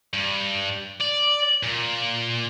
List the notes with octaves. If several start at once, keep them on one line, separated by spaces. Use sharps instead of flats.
G2
D5
A#2